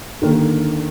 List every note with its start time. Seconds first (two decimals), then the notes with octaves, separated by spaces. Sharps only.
0.22 D3 D#3 A#3